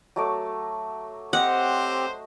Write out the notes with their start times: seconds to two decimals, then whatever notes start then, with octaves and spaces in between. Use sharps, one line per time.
0.16 F#3 A3 D6
1.33 C4 G4 C5 D#5 F#5